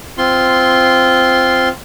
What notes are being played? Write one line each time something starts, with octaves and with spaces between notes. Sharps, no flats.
C4 F4 C6